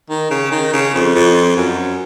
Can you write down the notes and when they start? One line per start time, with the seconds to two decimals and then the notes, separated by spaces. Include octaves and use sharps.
0.10 D#3
0.30 C#3
0.51 D#3
0.73 C#3
0.94 F2
1.15 F2
1.57 F#2